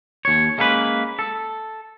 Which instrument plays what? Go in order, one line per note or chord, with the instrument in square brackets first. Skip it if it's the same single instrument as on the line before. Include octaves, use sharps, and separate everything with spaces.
[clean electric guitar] D#2 C#5
G#3 A#3 C#4 G4 B4
A4